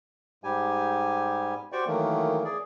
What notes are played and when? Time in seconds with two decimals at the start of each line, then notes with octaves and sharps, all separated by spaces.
0.44 G#2 G3 G4 G#5
1.72 F#4 G4 C5 D5 G5 C#6
1.87 D#3 E3 F#3 A3 A#3
2.44 G#4 D5